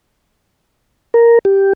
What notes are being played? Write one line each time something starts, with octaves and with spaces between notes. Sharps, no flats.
A#4
G4